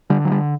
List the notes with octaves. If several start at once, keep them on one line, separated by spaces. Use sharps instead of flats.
D3 G3
F#3
G3